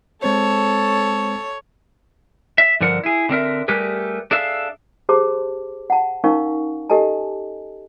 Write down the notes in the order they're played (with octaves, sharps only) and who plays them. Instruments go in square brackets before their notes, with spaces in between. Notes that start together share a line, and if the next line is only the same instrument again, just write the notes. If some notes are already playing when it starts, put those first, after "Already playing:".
[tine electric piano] G#3 C4 C5 [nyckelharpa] A4 A5 [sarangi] C#5
[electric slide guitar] E5
G2 D3 F3 A#4 F#5
E4 G#4
D3 C4 A#4 E5
G3 A3 G4 G#4 A#4 B4
D4 G#4 A4 E5 F5
[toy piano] G4 G#4 C5 A5 C6 D6
F#5 A5
C#4 D#4 A#4 F5 G#5 C#6
G4 A4 D#5 G#5 A5